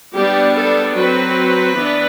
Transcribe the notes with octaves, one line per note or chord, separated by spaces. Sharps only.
G3 B3 D4 G4
A4
F#3 C4 B4
E3 B3 D4